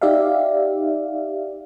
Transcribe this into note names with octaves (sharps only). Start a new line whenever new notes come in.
D#4 G4 D5 E5 F5